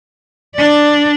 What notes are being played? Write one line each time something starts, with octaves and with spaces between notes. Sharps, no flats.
D4 D5